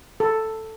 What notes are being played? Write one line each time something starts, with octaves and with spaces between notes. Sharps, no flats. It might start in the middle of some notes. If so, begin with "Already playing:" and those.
A4